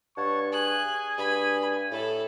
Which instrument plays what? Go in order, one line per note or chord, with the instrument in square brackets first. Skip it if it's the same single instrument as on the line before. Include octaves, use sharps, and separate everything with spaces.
[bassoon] G2 [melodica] C#5 F#5 A5 [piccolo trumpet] C#6
[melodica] G#4 [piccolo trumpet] G#5 [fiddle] F#6
[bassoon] G2 [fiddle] B5
[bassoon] A2 [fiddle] A4 B5